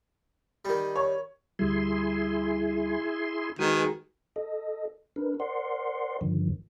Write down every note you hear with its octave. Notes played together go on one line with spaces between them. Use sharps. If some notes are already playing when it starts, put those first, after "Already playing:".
D#3 G3
C#5
D2 G3 E4 G#4 C6
D#3 G#3 F#4 G#4 B4 G#5
A4 D#5
D4 A#4 B4
A#4 C5 D5 F#5 C6
G2 D3 D#3 F3